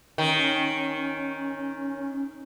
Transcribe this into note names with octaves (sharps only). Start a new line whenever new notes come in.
D#3 C#4